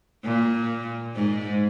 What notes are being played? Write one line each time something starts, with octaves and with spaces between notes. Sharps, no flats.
A#2
G#2